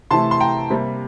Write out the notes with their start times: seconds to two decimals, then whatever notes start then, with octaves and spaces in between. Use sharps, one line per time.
0.11 C3 E3 A3 A5 C6
0.31 C6
0.40 G5 A#5
0.70 C3 G3 A#3